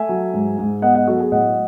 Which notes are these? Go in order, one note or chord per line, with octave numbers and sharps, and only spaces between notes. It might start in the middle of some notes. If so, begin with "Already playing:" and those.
Already playing: A3 E5 G#5
F#3
G#2
G#2
B3 D#5 F#5
D#5 F#5
F#3 F#4 A4
G#4
A2 D#5 F#5